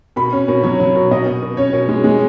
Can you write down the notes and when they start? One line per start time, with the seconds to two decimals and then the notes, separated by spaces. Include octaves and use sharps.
0.16 B2 B5
0.33 C#4
0.48 B2
0.63 F#3 C#5
0.80 F#3
0.96 B2
1.11 B2 D#5
1.26 B2
1.42 B2
1.57 C#4 C#5
1.73 B2
1.88 G#3
2.04 G#3